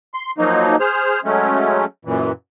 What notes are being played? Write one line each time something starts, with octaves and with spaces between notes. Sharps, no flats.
C6
F3 F#3 A#3 D#4
G#4 C5 F6
F#3 G#3 A3 C#4
F#2 A#2 E3